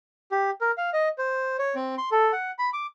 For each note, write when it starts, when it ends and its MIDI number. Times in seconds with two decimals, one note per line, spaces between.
0.32 0.50 67
0.61 0.71 70
0.78 0.90 77
0.93 1.09 75
1.18 1.57 72
1.59 1.75 73
1.75 1.95 60
1.98 2.09 84
2.12 2.32 69
2.33 2.51 78
2.59 2.70 83
2.73 2.86 86